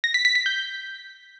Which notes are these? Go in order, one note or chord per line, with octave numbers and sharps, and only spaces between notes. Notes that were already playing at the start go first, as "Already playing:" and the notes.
A#6
B6
B6
B6
G6